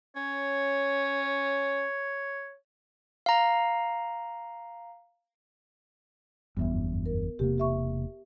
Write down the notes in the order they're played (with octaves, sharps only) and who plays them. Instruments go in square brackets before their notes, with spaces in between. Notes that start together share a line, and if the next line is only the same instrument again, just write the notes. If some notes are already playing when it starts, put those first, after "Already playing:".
[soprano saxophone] C#4 [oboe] C#5
[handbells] F5 A#5
[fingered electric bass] F#1 E2 G2 [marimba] B3 E5
[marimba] A#4
[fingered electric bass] E1 C3 A#3 [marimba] G4
[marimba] G4 E5 C#6